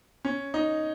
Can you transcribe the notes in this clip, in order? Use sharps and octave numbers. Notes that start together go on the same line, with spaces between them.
C#4
D#4